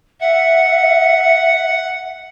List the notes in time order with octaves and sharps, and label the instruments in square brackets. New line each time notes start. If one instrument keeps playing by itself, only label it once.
[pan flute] E5 [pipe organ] F#5